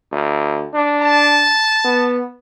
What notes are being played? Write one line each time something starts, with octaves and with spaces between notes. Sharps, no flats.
D2
D4
A5
B3